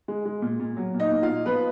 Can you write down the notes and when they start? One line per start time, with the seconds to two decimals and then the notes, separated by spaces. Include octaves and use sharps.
0.08 G#3
0.25 G#3
0.42 A#2
0.60 A#2
0.77 F#3
0.94 A#2
1.00 D#4 D#5
1.11 A#3
1.23 F4 F5
1.28 A#2
1.45 F3 B3 B4